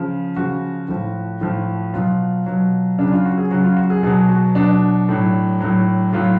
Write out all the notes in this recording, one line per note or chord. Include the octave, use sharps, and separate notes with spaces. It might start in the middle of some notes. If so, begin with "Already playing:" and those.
Already playing: C#3 F3
C#3 F3 F#4
A2 F3
A2 F3
B2 F#3 F4
B2 F#3
C#3 F#3 D4
F4
F#4
G#4
C#3 F#3 F#4
F4
F#4
G#4
B2 F#3 G#4
F#4
B2 F#3 D4
A2 F#3
A2 F#3
A2 F#3 F4